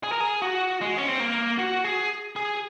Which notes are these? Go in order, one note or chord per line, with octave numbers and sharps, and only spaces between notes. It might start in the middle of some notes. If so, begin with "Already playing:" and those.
G#4
A#4
G#4
F#4
G#3
C#4
C4
A#3
F#4
G#4
G#4